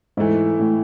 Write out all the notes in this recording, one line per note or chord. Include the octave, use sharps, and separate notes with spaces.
G#2 E3 A3 E4
A2